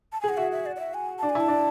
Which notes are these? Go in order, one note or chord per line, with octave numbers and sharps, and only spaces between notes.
A5
G#4 G#5
F#5
F#4 E5
E5
D5
D5
E5
G#5
D4 A5
G#5
E4
A5
D4